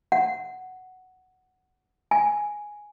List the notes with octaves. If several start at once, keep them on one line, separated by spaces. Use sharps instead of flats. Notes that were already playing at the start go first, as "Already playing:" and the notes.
F#5
G#5